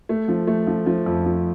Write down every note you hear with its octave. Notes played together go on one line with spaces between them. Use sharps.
A3
F3
A3
F3
F3
F2
F3